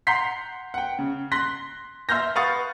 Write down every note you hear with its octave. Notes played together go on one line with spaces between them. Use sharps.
F#5 A#5 C6 G6 B6 C7
F#5 G5
C#3
C6 F#6 A#6 B6
E5 C6 F6 G6 A#6
B4 F5 F#5 C#6 D#6 A6